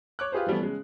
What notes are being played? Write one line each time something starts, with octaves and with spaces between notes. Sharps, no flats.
C#5 D6 F#6
F4 G4 G#4 B4 C5
E3 F3 G3 A3 B3
C#3 G#3